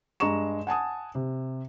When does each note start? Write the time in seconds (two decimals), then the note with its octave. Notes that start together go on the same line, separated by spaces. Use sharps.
0.20 G2 G#3 A#5 C#6 E7
0.67 F#5 G#5 A5 D#6
1.15 C3